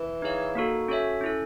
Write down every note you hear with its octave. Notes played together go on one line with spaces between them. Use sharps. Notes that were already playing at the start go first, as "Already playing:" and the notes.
Already playing: E3
D#4 G#4 C#5 F5
A#3 D#4 F#4 A4
C#4 F#4 A4 C#5 E5
C#4 E4 A4